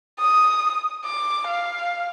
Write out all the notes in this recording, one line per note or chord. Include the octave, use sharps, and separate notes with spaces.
D#6
D6
F5